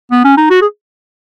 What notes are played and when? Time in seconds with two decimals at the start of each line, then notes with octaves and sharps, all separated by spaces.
0.11 B3
0.24 C#4
0.37 D#4
0.50 F#4
0.62 G#4